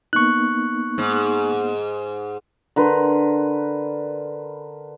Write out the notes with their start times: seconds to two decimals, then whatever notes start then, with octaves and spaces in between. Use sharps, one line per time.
0.13 A#3 B3 D#4 C#6 F#6
0.98 G#2
2.76 D3 A#4 B4 C6